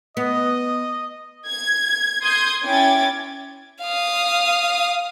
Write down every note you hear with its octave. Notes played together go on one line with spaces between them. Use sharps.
B3 D#5
G#6
C6 D#6 G6 G#6
C#4 E4 G5 D6 G#6 A6
F5 D#6